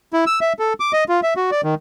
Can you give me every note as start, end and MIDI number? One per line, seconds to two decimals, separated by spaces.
0.13 0.25 64
0.27 0.39 88
0.41 0.53 76
0.59 0.73 69
0.80 0.92 86
0.93 1.04 75
1.09 1.21 65
1.23 1.34 76
1.36 1.51 66
1.51 1.61 74
1.64 1.75 51